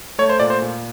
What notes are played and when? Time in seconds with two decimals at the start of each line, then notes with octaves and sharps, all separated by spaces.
0.19 A3 C#5
0.30 C5
0.40 A#2 D5
0.50 C5
0.62 A#2